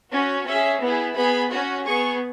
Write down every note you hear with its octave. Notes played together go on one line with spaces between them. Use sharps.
C#4 F#4
C#4 G#4 E5
B3 E4 G#4
B3 G#4 B5
C#4 F#4
B3 G#4 C#6